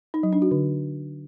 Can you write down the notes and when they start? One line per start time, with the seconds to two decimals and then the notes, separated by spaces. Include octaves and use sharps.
0.14 D#4
0.23 F#3
0.33 D4
0.42 F#4
0.51 D3